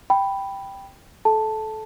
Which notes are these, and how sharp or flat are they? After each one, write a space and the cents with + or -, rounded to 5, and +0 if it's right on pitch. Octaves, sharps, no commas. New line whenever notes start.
G5 +0 B5 +0
A4 -25 A5 +0